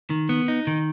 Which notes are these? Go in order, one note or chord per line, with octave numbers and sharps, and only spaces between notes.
D#3
B3
D#4
D#3